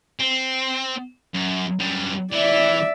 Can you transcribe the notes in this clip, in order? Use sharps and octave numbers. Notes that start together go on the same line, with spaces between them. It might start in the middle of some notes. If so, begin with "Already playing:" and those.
C4
F#2
F#2 G3
E3 D5 E5